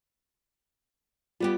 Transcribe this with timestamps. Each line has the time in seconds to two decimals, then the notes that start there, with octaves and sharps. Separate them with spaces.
1.40 G3 B3 F4 G4